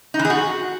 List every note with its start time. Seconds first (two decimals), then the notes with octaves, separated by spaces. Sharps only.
0.14 D#4
0.19 E3
0.25 G#4
0.30 F#4